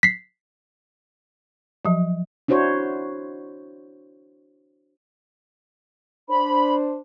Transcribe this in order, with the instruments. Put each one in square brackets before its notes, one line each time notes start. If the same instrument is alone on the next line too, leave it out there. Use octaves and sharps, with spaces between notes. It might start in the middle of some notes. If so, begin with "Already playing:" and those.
[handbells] B6 C7
[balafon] F3 F#3
[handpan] D4 E4 F#4 C5 C#5
[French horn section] D4 C5 [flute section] B5